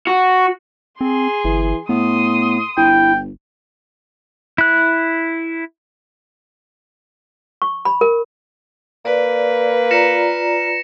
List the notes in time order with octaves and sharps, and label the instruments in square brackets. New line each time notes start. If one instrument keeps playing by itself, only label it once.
[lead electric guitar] F#4
[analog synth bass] C4 [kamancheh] G#4 C6
[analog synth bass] G1 [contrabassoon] E3
[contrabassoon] A2 [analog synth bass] B3 [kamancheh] C6 D#6
[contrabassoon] G1 [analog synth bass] E4 [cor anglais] G5
[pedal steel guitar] E4 F#6
[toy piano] C#6
B5
A#4
[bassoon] A#3 [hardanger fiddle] B4 [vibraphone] D5
[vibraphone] F4 D5 A#5 [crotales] A#6 C#7 E7